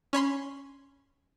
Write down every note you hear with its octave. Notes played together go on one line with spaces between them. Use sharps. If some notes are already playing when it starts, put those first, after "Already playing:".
C#4 C#5 B5 C6